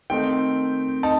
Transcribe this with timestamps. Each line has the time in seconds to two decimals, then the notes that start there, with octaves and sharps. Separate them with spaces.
0.10 D#3 A3 C4 D#4 G5
1.03 D#4 A5